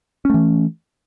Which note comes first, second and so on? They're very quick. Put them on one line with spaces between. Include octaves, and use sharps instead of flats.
C#4 A3 E3